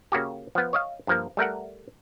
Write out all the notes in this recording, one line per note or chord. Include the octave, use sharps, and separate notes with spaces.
C#3 A#3 F#4 G4
F3 B3
C#5 D#5 F5
G2 F3 A#3
G3 A3 A#4 F#5